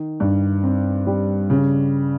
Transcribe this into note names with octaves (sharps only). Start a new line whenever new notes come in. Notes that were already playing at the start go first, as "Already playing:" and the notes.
Already playing: D#3
G2
C4
G3
C#3